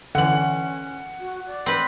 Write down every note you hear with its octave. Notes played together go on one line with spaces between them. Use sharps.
D3 E3 C#4 F#5 F#7
F#4
D5
C4 B4